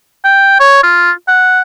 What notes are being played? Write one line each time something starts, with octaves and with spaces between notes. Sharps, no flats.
G5
C#5
F4
F#5